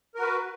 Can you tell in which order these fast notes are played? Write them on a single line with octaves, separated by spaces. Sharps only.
A#4 F#4 B4